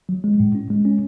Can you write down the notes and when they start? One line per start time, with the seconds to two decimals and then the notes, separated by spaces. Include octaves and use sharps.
0.09 F#3
0.24 G#3
0.40 A2
0.55 C#4
0.70 G#3
0.85 C#4